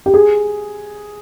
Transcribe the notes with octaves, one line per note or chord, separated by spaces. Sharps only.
G4
G#4